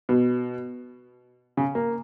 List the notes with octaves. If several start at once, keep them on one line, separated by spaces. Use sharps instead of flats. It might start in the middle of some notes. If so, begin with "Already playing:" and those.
B2
C#3
A#3